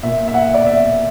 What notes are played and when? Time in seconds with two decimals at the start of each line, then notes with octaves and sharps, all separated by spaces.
0.03 A#2 E5
0.28 E5
0.34 F#5
0.54 D5
0.66 E5